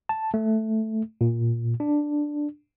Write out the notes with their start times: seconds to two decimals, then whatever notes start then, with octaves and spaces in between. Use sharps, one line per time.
0.09 A5
0.34 A3
1.21 A#2
1.80 D4